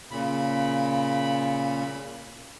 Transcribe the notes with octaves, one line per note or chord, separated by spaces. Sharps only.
A#2 C#3 B5